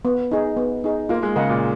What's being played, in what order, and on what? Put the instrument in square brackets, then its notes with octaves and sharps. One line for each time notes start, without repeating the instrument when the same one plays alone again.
[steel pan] B3
D#4 G#4
B3
D#4 G#4
[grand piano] A#3 [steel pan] F4
[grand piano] G#3
[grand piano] C#3 [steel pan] A#4 D#5 F#5
[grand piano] A#2